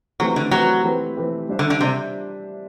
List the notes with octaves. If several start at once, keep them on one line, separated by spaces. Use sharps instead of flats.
E3 F#3 A3 C4 G4 B4
D3
E3 F#3 A3 C4 G4 B4
E3 A3 C4 G4 B4
E3 A3 C4 G4 B4
G3 D4 G4 C5 E5
D3
D3
C3 G3 D4 G4 C5 E5